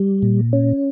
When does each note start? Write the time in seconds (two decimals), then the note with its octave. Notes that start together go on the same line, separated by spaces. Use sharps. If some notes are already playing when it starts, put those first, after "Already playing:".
Already playing: G3
0.22 A#2
0.53 C#4